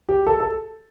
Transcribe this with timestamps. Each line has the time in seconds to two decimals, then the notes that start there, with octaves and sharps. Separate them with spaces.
0.09 G4
0.27 A4
0.40 A4